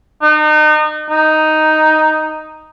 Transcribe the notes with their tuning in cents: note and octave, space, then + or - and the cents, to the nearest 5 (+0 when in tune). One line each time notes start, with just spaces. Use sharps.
D#4 -35
D#4 +0